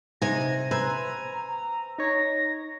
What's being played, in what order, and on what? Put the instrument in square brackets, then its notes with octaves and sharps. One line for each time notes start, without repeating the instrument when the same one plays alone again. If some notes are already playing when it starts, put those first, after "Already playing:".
[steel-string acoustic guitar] C3 G#5 [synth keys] D#4 [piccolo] A#6
[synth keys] B4 C5 E6 [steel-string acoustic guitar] G#5 [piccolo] A#5
[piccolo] A#5
[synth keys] D#4 C#5 [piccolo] A#6